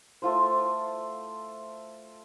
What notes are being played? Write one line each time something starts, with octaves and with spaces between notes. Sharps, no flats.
A3 F4 C5